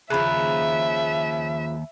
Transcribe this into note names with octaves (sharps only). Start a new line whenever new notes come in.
D#2 C#3 F3 E5 B5 F#6